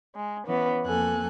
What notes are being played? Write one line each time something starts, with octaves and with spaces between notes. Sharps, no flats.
G#3
E3 B3 C#4
F2 A#3 A4 G#5 F#6